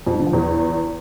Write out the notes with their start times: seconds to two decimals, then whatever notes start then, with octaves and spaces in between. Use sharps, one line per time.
0.07 F2
0.13 G#2
0.20 D3
0.27 F3
0.33 E2